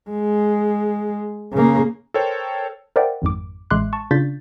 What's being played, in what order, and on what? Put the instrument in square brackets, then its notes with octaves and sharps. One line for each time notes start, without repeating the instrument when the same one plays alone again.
[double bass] G#3
C#3 A#3
[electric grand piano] A4 A#4 C5 C#5 G5
[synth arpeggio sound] A#4 C5 D5 E5 F#5 G5
G#1 F2 G#2 D6
A1 G#3 E5 C6 D6 F#6
A5 C#6
C#3 D4 F4 G6 A6 B6